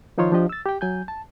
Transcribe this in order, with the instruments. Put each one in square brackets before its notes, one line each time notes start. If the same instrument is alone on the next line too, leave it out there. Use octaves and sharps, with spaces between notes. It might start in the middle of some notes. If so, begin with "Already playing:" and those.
[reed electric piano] D#3 F3 D#4 F4 C#5 C6
F3 D4 G4 D#5
E6 A6
G4 G5
F#3 G#5 G6
A5